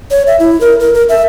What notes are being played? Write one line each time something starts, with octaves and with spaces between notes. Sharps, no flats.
C#5
E5
E4
A#4
A#4
A#4
E5